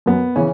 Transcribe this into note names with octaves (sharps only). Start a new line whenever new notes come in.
F#2 B3
C#3 E3 C#4